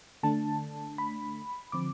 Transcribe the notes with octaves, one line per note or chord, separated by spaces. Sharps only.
D3 A3 D4 A5
B5
D3 F3 C4 D6